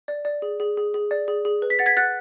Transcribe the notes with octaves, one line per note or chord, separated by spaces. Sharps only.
D5
D5
G#4
G#4
G#4
G#4
D5
G#4
G#4
B4
B6
F#5 A6
G#6 B6
F#5 F#6 A6